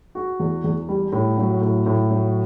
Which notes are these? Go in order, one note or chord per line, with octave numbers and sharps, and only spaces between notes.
F#4
E2
E2
G3
A2
F#3
A2
A2
F#3